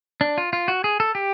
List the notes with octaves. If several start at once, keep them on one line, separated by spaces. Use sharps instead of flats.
D4
F4
F4
F#4
G#4
A4
G4